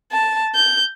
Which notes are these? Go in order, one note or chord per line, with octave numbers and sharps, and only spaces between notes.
A5
G6